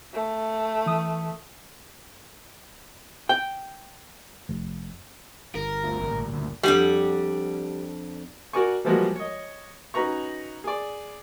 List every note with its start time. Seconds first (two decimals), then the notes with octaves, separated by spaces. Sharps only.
0.14 A3
0.86 E3 D#6
3.29 G5
4.49 F1
5.55 G1 A#4
5.84 D2 C4 F4
5.99 A1 A#2 C#3
6.32 D2
6.63 F2 G3 D4 F#5
8.53 F#4 A#4 D5 G#5 C#6
8.85 E3 F3 G3 G#3 A#3 F#4
9.16 C#5 D#5
9.94 C#4 D#4 F#4 B4 A#5 C#6
10.64 G#4 D5